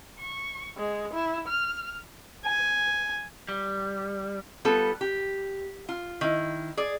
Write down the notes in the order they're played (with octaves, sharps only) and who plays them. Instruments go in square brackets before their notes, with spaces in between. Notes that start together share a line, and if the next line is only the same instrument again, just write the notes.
[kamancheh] C#6
G#3
E4
F6
[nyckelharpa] G#5
[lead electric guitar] G3
[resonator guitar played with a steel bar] G3 B3 F4 A4
G4
F4
D#3 E4
G#4 D5